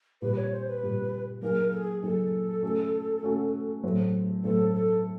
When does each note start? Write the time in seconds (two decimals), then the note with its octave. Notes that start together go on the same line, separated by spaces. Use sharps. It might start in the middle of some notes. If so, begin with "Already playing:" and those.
0.22 A#2 G3 C4 B4
0.36 C#5
0.51 C5
0.67 B4
0.82 A#2 G3 C4
1.42 F#3 A#3 D#4 G#4 A#4
1.72 A4
1.77 G#4
2.03 F#3 A#3 D#4 G#4 A4
2.63 A3 C#4 F#4
3.23 A3 C#4 F#4
3.84 A2 F#3 A3 C4
4.44 A2 F#3 A3 C4 A4
4.74 A4